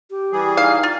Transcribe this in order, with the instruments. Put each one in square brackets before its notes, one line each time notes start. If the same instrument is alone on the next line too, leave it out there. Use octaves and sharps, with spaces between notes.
[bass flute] G4
[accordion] E3 G3 G#4
[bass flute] D#4 [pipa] F5
[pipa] F4